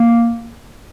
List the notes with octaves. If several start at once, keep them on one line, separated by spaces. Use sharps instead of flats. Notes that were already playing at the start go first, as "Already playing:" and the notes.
Already playing: A#3